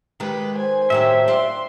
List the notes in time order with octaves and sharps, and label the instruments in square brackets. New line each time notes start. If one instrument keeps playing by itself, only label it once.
[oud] D#3 G#3 [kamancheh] G4 B4
[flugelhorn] C5 [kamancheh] G#5
[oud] A2 D#3 F#3 [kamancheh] G4 [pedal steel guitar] E5
[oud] D4 F4 G4 [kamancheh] C6